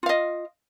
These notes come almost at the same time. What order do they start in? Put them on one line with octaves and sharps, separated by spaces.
F4 F5 D#5